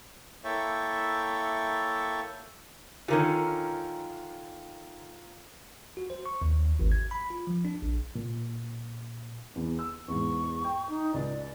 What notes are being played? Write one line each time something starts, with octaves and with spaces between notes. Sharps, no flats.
A#3 E4 A4 C#5 E5 G5
D3 D#3 C#4 F4 A#4
F#4
C5
C#6
D#2
G#1
G#6
B5
F4
F3
D4
A#1
A#2
E2
E6
E2 G#2 C#6
G5
D#4
C#2 D5